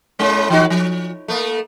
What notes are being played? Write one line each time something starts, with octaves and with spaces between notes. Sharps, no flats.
A2 G#3 C#4
E3 D#4 F#4
F3
A3 A#3